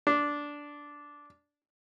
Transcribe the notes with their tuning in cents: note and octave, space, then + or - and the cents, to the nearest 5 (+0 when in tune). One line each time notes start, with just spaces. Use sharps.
D4 -10